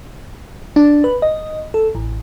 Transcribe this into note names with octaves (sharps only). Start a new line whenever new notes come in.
D4
B4
D#5
A4
A1